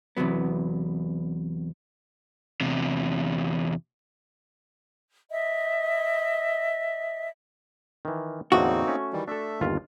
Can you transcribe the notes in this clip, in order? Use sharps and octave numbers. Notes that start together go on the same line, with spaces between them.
E2 G2 C3 F#3 B3
E2 C3
D#5 E5
D#3 E3
E2 A2 D3 A#3 C4 D#4 F#4
A3 C#4
D#3 E3 G3
A3 D4 A4 E5
G1 D#2 F4